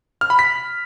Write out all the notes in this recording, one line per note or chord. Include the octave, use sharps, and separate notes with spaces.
F6
B5
B6